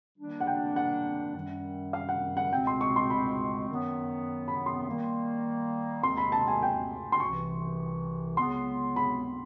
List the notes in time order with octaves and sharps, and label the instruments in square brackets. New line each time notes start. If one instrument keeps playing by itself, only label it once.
[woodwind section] D#3 G3 A#3 D4
[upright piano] F#5
G5
F#5
[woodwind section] F#2 D#3 G3
[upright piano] F5
F#5
F#5
[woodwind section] C#2 B2 G#3 C4 [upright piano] G5
[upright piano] C6
C#6
C6
B5
[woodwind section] F#2 D#3 F#3 B3
[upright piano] B5
C6
[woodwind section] D#3 G3 A#3
[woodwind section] D#2 D#3 G#3 C4 [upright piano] C6
[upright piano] B5
A5
G#5
G5
C6
[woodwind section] C2 C3 E3 [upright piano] C#6
[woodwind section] C#2 C#3 F#3 B3 [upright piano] C6
[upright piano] B5